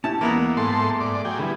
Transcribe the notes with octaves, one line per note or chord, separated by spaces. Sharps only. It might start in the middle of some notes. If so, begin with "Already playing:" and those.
C#4 E4 G4 A5
E2 G#3 A#3 B3 E4 A#5
G#2 A3 A4 C6
G#2 D5
F#3 G#4 G5
D3 G3 B3 E4